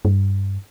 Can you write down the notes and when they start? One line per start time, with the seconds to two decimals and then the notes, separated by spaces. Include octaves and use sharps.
0.05 G2